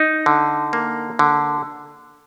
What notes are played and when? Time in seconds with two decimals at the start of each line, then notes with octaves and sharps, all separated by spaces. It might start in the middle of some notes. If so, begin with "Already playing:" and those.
Already playing: D#4
0.26 D3
0.73 A#3
1.19 D3